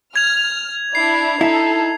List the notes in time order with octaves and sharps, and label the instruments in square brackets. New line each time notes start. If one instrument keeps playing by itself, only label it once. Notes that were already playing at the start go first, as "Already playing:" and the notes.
[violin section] F6 [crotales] G#6 F7
[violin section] D4 E4 D5 [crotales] C7
[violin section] D#4 A4 [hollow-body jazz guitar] E4